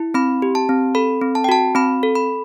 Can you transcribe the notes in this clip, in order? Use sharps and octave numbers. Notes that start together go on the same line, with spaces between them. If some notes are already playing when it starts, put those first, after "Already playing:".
Already playing: E4
C4 B5
G4
A5
C4
A4 B5
C4
A5
G5
F#4 A5
C4 B5
A4
B5